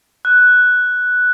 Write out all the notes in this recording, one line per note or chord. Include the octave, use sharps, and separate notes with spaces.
F#6